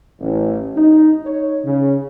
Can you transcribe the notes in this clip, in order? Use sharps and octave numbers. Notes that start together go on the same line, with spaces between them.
A1
D#4
C#5
C#3